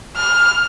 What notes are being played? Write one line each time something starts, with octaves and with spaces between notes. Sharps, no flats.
F6